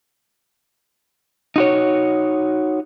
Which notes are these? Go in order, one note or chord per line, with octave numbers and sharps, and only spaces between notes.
D#4 F#4 C#5